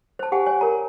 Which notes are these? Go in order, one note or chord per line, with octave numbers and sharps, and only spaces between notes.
C5 A5
G4 F#5 G#5
C#5 G#5
A#4 A#5